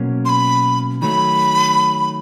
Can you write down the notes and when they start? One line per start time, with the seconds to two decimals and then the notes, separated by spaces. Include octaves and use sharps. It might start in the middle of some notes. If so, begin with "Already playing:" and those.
Already playing: B2 F#3 A#3 C#4
0.25 C6
0.29 B5
1.02 D#3 F#3 A3 B5